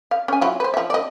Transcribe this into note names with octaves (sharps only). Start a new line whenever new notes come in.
F5
C#4 G#5
F#3 E4 F4
B4 C5
F3 E5
D5 D#5